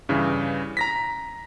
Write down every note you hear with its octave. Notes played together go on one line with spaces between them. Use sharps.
G2 C#3 E3
A#5 A#6 B6